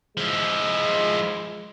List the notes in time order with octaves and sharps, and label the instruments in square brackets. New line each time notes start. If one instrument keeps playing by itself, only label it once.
[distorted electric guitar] F3 E4 [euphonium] G#3